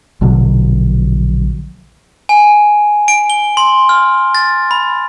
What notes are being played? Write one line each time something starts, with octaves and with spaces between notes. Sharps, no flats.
A#1 B2 D3 F#3
G#5
D7
G7
C6
F6
A6
B5